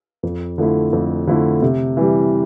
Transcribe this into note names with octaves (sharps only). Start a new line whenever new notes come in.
F2
D3 F3 A3 E4
F2
D3 F3 A3 E4
C3
E3 G3